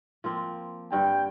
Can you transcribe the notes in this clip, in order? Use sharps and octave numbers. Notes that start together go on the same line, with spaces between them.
F3 A#3 C4
G2 D3 G5